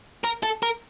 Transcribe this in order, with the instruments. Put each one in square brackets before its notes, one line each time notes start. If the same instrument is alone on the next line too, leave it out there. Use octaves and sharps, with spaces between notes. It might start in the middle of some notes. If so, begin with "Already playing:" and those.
[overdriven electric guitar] A#4
A4
A#4